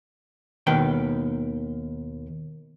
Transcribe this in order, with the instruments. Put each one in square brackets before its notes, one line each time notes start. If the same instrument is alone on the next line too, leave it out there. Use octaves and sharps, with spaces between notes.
[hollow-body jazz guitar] D#2 B2 D#3 B4 G5